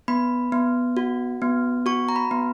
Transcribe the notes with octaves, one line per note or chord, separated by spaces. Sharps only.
B3 B5
B3
F#4
B3
F#4 C#6
A#5
B5
B3